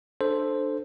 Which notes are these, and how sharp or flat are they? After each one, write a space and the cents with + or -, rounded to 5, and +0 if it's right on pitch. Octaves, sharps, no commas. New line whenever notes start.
D4 +20 A4 +0 C5 +0